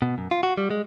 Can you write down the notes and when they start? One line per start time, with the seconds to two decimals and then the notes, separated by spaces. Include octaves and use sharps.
0.02 B2
0.18 F#2
0.31 F4
0.43 F#4
0.58 G3
0.70 G#3